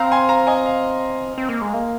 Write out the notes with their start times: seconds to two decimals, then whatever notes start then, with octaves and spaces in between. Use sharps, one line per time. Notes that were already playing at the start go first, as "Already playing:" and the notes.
Already playing: C4 F5 A#5
0.11 G#5 C6
0.29 F5 A#5
0.47 D#5 G#5
0.66 F5
1.38 C4
1.49 A#3
1.61 G#3
1.74 A#3